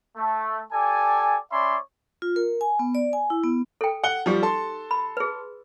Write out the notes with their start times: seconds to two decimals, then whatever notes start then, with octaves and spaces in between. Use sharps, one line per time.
0.17 A3
0.72 G4 A4 D5 G#5
1.52 C#4 C#5 D5 E5 B5 C6
2.22 F4
2.36 A#4
2.61 G#5
2.79 B3
2.95 D5
3.13 G#5
3.30 E4
3.43 B3
3.81 A4 G5
4.04 F#5 G7
4.26 F3 G3 D#4 G4
4.42 A4 A5 C6
4.91 B5
5.17 G#4 B4